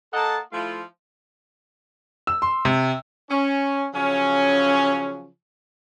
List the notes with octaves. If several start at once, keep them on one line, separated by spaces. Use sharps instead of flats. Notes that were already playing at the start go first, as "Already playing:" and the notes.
A#3 A4 D#5 F#5 A5
F3 A3 E4 F4
E6
C6
C3
C#4
C#3 F3 F#3 C#4